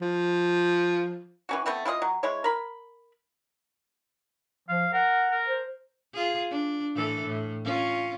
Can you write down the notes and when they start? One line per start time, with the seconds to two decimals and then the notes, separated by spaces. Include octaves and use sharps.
0.01 F3
1.49 E3 C#4 F#4
1.66 A3 B3 C4 E4
1.85 E4 F4 G#4 D#5
2.02 F#3
2.23 G#3 E4 C#5
2.44 A#4 B5
4.69 F3 F5
4.93 A#4 F#5
5.31 A#4
5.48 C5
6.13 F4 G#4
6.50 D4
6.94 A2 E3 A4
7.26 A2
7.64 C#4 F4